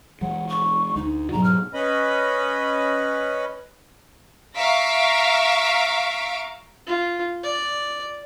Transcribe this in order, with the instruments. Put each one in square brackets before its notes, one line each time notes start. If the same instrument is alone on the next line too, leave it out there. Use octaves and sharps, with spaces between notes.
[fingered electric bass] E3 G#3 [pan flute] F#5
[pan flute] C#6
[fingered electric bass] D2 [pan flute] D#4
[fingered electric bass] G#2 B2 F#3 [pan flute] A#5
[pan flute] F6
[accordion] C#4 B4 D#5 B5
[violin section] E5 F5 A#5 C#6 B6 D7
[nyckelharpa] F4
D5